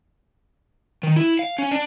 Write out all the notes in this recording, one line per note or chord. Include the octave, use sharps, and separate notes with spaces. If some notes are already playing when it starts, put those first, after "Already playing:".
D#3
E4
F5
C#4
D4